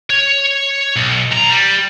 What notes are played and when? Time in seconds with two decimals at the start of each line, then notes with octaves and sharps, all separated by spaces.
0.10 C#5
0.96 B1
1.31 B1 A#5
1.49 G3